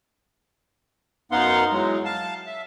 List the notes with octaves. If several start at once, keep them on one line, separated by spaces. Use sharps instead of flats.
F#2 B3 D#4 F5 F#5 C6
E3 F#3 G#3
F5 A5
E5